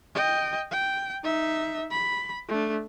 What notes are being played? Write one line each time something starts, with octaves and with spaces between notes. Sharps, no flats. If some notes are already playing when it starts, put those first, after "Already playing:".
D#5 G5
G5
D#4 E5
B5
A3 D4